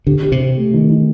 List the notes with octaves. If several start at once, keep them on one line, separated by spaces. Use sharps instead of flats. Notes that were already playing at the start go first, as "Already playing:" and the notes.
D3 G4
G4
C3
G4
A3
D#3
D#3